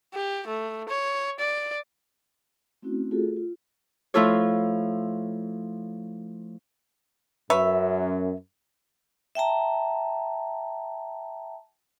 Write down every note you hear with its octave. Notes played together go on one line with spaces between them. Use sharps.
G4
A3
C#5
D5
A3 C4 C#4 E4 F#4
A3 F4 F#4 G#4 A4
F4
F3 A3 E4 F4 A4 C#5
F#2 B4 C#5 E5
E5 G5 A5 A#5